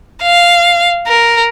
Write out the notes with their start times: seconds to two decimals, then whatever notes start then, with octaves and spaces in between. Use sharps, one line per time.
0.22 F5
1.07 A#4